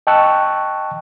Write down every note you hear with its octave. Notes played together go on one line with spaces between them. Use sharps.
D#5 G5 A5 C#6 E6 F#6